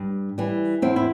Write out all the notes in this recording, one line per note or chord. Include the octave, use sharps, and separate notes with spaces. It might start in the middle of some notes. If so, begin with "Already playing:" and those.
Already playing: G2
E3 G3
E2 C4 E4
E4